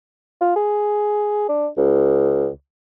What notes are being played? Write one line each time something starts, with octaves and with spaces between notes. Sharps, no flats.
F4
G#4
D4
C#2